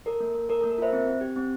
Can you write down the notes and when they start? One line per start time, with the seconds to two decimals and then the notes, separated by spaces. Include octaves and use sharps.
0.06 A4 A#4
0.20 A#3
0.35 A#3
0.49 A4 A#4
0.61 A#3 A4
0.70 A#4
0.78 F4 C5 E5
0.93 C4
1.07 C4
1.21 G4
1.36 C4